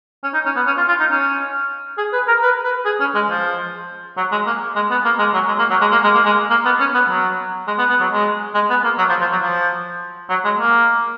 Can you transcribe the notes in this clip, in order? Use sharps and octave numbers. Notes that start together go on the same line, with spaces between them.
C#4
D#4
C#4
B3
C#4
F4
F4
D#4
C#4
G#4
B4
A#4
B4
B4
G#4
C#4
G#3
F3
F#3
G#3
A#3
G#3
B3
A#3
G#3
F#3
G#3
A#3
F#3
G#3
A#3
G#3
A#3
G#3
A#3
B3
C#4
B3
F#3
G#3
B3
B3
F#3
G#3
G#3
B3
A#3
F#3
F3
F3
F#3
F3
F#3
G#3
A#3